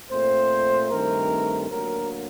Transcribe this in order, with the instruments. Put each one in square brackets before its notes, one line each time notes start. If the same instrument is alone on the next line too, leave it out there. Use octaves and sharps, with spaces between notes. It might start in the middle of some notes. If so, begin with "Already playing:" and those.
[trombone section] A#2 A3 C4 C5
G2 D#3 A3 C4 A#4
D2 D3 F#3 A#3 A#4